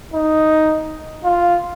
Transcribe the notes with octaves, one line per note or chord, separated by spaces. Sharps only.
D#4
F4